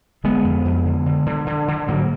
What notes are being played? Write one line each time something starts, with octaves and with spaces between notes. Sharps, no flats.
D3 G#3 B3
F2
F2
D3
D3
D3
D3
D3
G#2 F#3 A#3